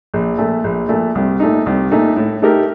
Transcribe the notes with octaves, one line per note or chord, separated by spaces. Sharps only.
A#1
A#2 A3
A#1
A#2 A3
C2
A#2 A3 D#4
C2
A#2 A3 D#4
A2
A3 D#4 G4 A#4